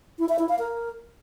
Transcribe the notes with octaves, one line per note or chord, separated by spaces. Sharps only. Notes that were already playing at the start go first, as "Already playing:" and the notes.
E4
E5
E4
F5
A#4